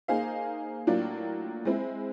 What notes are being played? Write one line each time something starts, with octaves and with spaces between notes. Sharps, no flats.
A#3 D#4 G#4 C5 F5
A2 F#3 A#3 D4 F4
G#3 C4 E4